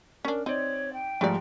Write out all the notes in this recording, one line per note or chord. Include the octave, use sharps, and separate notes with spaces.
C#4 D4 A#4
C4 D#4 C#5 D5
G5
G#2 F3 G3 A3 D5